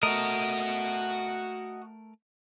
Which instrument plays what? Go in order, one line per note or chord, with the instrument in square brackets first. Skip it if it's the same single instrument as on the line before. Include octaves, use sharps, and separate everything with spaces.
[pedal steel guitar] A3 A#4 [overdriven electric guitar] F#4 D#5